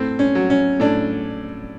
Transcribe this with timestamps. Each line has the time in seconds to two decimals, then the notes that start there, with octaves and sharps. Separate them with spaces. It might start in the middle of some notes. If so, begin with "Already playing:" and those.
Already playing: A2 C4
0.19 C#4
0.35 F#3
0.50 C#4
0.80 A2 D4